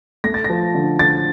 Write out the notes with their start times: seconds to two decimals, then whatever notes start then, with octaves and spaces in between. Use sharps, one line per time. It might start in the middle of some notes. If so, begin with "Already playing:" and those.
0.24 A3 A#6
0.34 A6
0.44 A#6
0.50 F3
0.75 D3
0.99 D3 A6